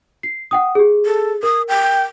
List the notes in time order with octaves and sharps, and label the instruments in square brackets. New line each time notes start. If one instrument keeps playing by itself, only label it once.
[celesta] C7
F#5 G5 D#6
G4 G#4
[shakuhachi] A4
[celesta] A#4 [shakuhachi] D#6
[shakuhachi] G5